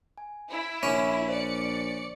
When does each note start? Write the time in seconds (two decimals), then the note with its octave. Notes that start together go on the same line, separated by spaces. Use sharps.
0.18 G#5
0.50 E4
0.83 A#1 C#4 E5 D6
1.28 C5 D5 C#7